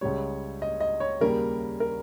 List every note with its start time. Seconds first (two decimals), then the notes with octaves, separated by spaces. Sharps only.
0.01 C#2 C#3 G3 C#5
0.62 D#5
0.80 D#5
1.00 C#5
1.20 D#2 C#3 G3 A#3 A#4
1.80 A#4